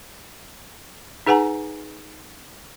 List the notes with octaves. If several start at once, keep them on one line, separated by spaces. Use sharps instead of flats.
D#4 G#4 B4 F#5 G#5 A#5